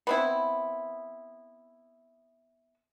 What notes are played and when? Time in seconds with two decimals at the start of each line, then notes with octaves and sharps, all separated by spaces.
0.07 B3 C4 E4